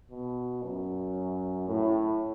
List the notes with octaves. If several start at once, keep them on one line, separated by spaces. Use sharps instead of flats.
B2
F#2
A2